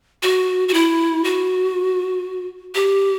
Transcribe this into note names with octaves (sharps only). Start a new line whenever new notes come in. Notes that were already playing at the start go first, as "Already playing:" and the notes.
F#4
F#4
E4
F#4
G4